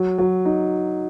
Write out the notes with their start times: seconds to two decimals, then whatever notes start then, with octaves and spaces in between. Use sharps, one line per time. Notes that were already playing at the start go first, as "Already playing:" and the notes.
Already playing: F#3
0.18 F#3
0.45 D#4